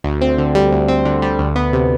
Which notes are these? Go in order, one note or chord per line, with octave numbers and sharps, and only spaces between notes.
D2
C4
D3
G3
D2
C4
D3
G3
D2
B3
C3